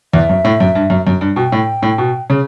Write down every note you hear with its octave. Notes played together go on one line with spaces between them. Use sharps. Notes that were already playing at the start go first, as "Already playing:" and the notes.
E2 E5
F#2
A2
F#2
G2
F#2
F#2
G2
B2 G5
A2
A2
B2
C#3